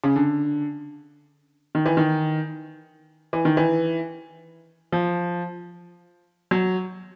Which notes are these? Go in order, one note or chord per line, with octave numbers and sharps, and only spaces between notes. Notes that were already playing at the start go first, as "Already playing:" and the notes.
C#3
D3
D#3
E3
D#3
E3
D#3
E3
F3
F#3